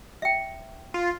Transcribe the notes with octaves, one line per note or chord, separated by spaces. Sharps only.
E5 G5
F4